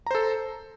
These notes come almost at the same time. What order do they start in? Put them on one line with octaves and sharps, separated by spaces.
A#5 C5 A4